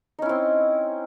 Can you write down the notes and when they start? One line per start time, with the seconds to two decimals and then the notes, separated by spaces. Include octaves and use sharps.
0.19 D#4
0.22 C#4
0.26 E4
0.29 C4